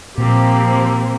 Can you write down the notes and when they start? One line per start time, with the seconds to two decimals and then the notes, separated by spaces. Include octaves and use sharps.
0.18 A#2 F3 A#3 C4 G4